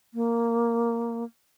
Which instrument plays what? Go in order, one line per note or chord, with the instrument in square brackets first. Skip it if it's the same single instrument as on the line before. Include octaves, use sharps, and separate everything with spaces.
[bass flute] A#3